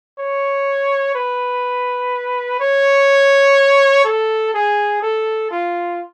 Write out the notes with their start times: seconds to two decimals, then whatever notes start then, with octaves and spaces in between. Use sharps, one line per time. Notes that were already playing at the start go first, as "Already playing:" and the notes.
0.18 C#5
1.15 B4
2.60 C#5
4.05 A4
4.54 G#4
5.02 A4
5.51 F4